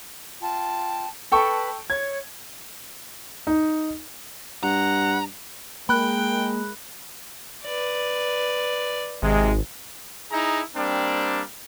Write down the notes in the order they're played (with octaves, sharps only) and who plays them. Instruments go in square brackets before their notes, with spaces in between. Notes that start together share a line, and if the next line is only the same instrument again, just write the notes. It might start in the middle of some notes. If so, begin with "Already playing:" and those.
[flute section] F4 G5 A5
[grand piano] A4 G5 C#6 [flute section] B4 A5 B5
[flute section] C#5 [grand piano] G#6
[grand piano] D#4
[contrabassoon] G2 [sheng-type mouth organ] F#5 [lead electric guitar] A#5
[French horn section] G#3 A#4 [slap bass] A#3 [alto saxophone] G5 [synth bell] B5 F#6
[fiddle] B4 D5
[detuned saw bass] G#1 [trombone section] C3 G#3
[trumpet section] D#4 E4 G#4 A#5
G3 A#3 C4 D4